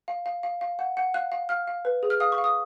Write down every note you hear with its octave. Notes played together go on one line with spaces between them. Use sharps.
F5
F5
F5
F5
F#5
F#5
F5 F#6
F5
F5 F6
F5
B4
G#4
F6
F5 D#6
C#6
F5
D#6